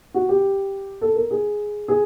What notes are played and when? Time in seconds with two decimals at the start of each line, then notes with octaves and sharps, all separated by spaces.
0.14 F#4
0.29 G4
1.01 A4
1.16 A#4
1.31 G#4
1.88 G#4